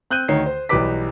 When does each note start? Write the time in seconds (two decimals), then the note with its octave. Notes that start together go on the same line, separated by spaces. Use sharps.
0.10 C4 F#6 G6 D#7
0.28 D2 D#3 C#5 C7
0.46 C5
0.69 B1 E3 G3 B4 D6 B6